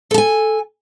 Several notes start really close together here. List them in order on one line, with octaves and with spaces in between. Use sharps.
A4 A5 G#5